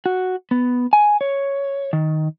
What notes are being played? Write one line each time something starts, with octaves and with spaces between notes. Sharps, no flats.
F#4
B3
G#5
C#5
D#3